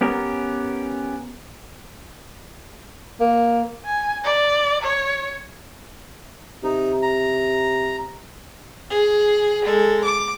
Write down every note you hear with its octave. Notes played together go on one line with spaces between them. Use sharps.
B3 C#4 G4 A#4
A#3
G#5
D5
C#5
C3 D#4
A#5
G#4
G#3 A4
D6